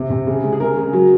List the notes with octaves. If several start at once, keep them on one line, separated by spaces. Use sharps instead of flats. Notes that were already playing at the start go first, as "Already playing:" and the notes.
Already playing: C3
C3
C#3
G#3
G#4
G#3 A#4
C#3
F#3